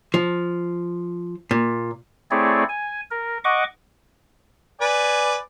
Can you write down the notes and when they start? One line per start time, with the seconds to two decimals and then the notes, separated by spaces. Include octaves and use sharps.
0.14 F3
1.51 A#2
2.31 A3 C4 E4 G#4 C#5 D5
2.69 G#5
3.11 A#4
3.44 D#5 F#5 C#6 D6
4.81 B4 D5 G#5